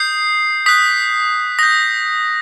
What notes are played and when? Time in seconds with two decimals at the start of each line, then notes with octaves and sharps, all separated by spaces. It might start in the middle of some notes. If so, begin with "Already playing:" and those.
Already playing: D#6 G6 C7
0.66 D#6 F#6 B6
1.59 D#6 G6 A#6